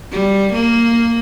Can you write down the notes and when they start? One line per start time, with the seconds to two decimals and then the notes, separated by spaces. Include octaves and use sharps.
0.12 G3
0.53 A#3